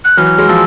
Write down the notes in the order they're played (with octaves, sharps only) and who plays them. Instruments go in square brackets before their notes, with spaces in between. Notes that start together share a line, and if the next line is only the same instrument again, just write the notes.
[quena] F#6
[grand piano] E3 F#3 [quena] F6
[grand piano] F#3 G#3
[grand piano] F3 [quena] E6